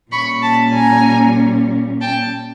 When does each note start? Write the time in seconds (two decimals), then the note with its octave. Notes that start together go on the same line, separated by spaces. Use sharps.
0.11 A#2 G3 A#3 C#4 B5 C#6
0.42 A5 B5
0.74 G#5 A#5
2.01 G5 A5